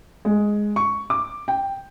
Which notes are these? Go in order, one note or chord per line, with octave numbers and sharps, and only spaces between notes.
G#3
C#6
D6
G5